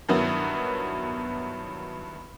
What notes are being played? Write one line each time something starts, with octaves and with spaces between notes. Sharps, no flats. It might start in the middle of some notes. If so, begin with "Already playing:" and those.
G2 D#3 F#3 B3 E4